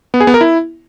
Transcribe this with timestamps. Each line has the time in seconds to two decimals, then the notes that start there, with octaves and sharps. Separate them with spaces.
0.14 B3
0.20 G#4
0.27 B3
0.34 A#4
0.41 E4